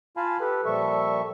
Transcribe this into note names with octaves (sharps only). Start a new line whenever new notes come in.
F4 F5 G#5 A5 B5
G4 A4 B4
A#2 F3 G3 A4 E5 C#6